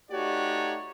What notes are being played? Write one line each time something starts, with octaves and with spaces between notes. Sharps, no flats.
A3 D#4 F#4 G4 C#5 D5